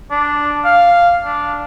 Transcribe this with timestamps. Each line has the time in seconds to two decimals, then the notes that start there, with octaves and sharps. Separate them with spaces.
0.11 D4
0.65 F5
1.24 D4